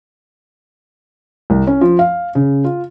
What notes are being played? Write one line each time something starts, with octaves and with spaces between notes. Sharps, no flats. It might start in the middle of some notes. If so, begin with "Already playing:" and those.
C2
C#4
F3
F5
C#3
F4